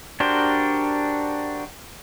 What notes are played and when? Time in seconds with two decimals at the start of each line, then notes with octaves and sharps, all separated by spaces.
0.20 D4 F#4 G4 A#4 C5